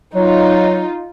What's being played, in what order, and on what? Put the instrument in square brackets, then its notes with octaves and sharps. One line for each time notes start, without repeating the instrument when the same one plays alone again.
[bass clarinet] F#3 [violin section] D#4 F4